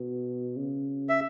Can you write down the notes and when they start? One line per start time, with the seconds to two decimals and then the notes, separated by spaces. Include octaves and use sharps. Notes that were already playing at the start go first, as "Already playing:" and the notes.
Already playing: B2
0.57 C#3
1.09 E5